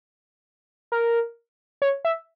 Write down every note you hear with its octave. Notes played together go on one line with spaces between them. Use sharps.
A#4
C#5
E5